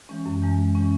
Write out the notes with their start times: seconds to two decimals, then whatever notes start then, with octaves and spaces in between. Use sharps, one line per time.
0.09 E3 G#3 C#4
0.26 F#2
0.42 E3 G#3 C#4
0.58 F#2
0.75 E3 G#3 C#4